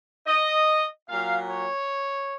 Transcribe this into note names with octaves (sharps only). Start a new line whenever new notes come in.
D#5
A#2 F#3 F5
C#5